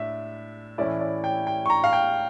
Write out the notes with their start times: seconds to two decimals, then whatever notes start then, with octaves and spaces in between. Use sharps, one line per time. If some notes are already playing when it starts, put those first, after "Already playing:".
Already playing: A2 D4 E5
0.78 A2 E3 A3 C#4 E4 D5
1.00 D5
1.24 G5
1.47 G5
1.66 C#6
1.70 A#5
1.84 F5
1.93 G5